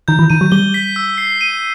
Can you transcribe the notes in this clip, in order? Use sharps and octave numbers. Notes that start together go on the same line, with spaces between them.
D#3 G6
E3
D#3 D#7
F#3
G3 G7
B6
E6
C7
D#7